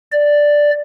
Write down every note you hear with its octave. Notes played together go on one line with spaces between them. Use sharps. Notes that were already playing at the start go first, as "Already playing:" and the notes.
D5